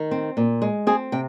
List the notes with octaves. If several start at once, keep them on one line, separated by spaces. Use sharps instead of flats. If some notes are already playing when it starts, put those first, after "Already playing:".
Already playing: D#3
C4
A#2
G#3
C4 G#4
C3 G5